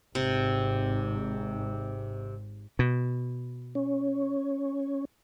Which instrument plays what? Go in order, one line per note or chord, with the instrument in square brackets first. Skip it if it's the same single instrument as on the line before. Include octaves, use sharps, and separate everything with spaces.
[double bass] G#1 G#2 [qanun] C3
[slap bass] B2
[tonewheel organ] C#4